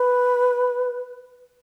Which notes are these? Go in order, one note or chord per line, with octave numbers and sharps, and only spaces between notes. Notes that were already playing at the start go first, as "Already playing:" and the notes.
Already playing: B4